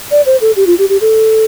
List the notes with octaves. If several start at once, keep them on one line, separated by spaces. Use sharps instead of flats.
D5
C5
A4
G4
F4
G4
G4
A4